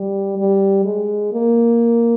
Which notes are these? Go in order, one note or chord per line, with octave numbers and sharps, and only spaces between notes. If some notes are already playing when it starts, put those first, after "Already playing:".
Already playing: G3
G3
G#3
A#3